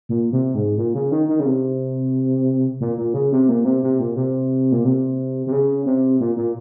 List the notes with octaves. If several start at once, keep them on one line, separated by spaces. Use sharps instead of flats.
A#2
C3
G#2
A#2
C#3
D#3
D#3
C#3
C3
A#2
A#2
C#3
C3
A#2
C3
C3
A#2
C3
A#2
C3
C3
C#3
C3
A#2
A#2